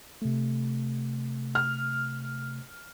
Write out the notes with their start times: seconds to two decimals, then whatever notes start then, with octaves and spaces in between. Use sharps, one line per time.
0.22 C3 A3
1.55 F6